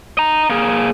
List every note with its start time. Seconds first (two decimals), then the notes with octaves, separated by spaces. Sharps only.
0.18 D#5 A#5
0.50 A#3 G#4